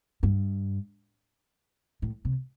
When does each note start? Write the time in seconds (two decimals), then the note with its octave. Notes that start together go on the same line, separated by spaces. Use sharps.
0.23 G2
2.02 A2
2.25 C3